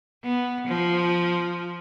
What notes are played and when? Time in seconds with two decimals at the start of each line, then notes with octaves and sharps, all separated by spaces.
0.24 B3
0.68 F3